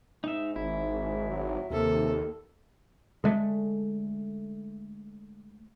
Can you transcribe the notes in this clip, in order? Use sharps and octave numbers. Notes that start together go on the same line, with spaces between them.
G#2 D#4 E5
G#1 E4
F#3
D#2 C3 A#3 A4
D3 G#3 A3